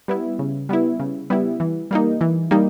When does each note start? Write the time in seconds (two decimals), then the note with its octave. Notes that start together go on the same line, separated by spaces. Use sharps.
0.08 G3 B3 E4
0.39 C#3
0.69 G3 B3 E4
1.00 C#3
1.30 G3 B3 E4
1.60 E3
1.91 G3 A#3 D#4
2.21 E3
2.51 G3 A#3 D#4